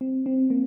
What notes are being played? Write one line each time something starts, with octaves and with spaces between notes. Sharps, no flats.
C4
C4
A#3